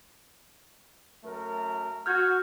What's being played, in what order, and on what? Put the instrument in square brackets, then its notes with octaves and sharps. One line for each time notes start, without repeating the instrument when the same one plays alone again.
[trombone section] F#2 A3 A#4
[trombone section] F#4 [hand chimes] F6 G6 G#6